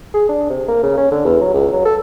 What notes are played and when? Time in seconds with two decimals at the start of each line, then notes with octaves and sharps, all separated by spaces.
0.14 G#4
0.29 D4
0.50 C3
0.68 A#3
0.83 C#3
0.97 C#4
1.11 D3
1.25 E2
1.41 F#3
1.54 C#2
1.73 F#3
1.85 A4